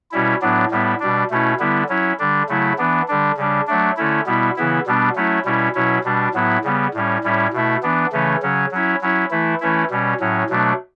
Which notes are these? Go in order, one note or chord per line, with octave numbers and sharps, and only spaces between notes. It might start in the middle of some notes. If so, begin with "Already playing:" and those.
B2 G3 C#4 E4
A2 F#3 B3 D4
A2 G3 B3 E4
B2 G3 D4
B2 A3 C#4 E4
D3 G3 B3 E4
F#3 C#4 E4
D3 G3 D4
C#3 F#3 A3 E4
E3 B3 D4
D3 G3 D4
C#3 G3 D4
F#3 A3 D4
D3 A3 C#4 E4
B2 G3 B3 E4
C#3 E3 B3 E4
B2 G3 B3 D4
F#3 A3 C#4 E4
B2 G3 C#4 E4
B2 F#3 C#4 E4
B2 G3 D4
A2 F#3 B3 E4
C#3 G3 B3
A2 G3 C#4
A2 G3 C#4 E4
B2 A3 E4
E3 B3 D4
C#3 E3 A3 C#4
C#3 F#3 C#4
F#3 C#4 E4
F#3 C#4 E4
E3 A3 E4
E3 A3 C#4 E4
B2 G3 C#4
A2 F#3 C#4
B2 F#3 A3 D4